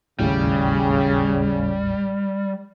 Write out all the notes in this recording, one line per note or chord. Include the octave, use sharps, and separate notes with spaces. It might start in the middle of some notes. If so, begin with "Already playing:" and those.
G#1 D#2 A2 C#3 G3